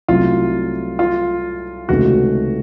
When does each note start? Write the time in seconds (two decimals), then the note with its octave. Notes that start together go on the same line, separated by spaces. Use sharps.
0.08 C2 C3 F#3 A3 C#4 F4
0.99 F4
1.89 C#2 C3 D#3 A3 C#4 F#4